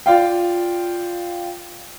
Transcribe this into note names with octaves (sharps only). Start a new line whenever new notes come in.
F4 D5 F5 G5